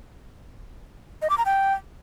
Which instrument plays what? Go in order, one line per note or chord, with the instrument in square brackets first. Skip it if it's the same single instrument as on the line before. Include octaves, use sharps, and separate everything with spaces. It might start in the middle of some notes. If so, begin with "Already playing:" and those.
[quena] D#5
D6
A#5
G5